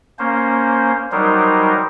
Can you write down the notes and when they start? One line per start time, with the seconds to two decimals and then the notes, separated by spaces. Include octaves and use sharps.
0.19 A#3 C#4 C5
1.12 F#3 G3 D#4 A#4 C5